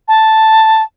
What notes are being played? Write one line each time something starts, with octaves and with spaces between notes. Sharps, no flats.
A5